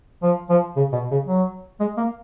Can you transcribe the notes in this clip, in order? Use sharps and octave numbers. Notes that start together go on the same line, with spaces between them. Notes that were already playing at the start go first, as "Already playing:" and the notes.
F3
F3
C#3
B2
C#3
F#3
G#3
A#3